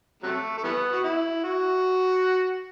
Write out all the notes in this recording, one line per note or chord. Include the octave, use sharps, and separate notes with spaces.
C3 F#3 A3
A3
E3 G3 B3
F#4
E4
F#4